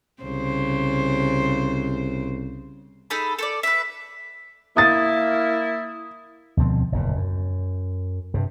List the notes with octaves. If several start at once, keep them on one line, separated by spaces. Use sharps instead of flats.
C2 C#3 C5
D#4 G#4 A4 B5
A4 C5 D5
B4 E5
A#3 E4 D#6 A6
D2 B2 F3 C4
F#1 E2 A#2
F#2
G2 C3